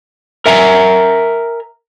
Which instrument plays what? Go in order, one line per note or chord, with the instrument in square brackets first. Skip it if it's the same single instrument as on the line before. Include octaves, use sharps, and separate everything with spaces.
[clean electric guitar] A#4 E5 G#5 A#5